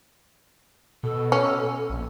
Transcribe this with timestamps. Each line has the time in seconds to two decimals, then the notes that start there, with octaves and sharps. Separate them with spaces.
1.03 B2 A4
1.32 C#4
1.90 A#1